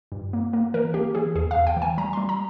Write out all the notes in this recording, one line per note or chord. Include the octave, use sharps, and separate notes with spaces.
G2
A#3
A#3
E3 A#4
A#3 G4
E3 G#4
E2 G#4
F5
E2
G5
E3
G#5
G3 A#5
G3 C6
A#5